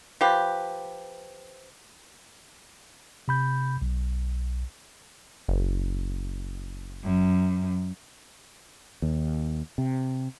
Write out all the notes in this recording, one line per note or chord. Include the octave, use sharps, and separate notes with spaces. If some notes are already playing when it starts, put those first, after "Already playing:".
F3 G4 B4
C3 B5 G6
B1
F#1
F#2
D#2
C3